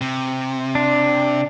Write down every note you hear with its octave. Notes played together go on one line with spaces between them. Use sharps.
C3
D4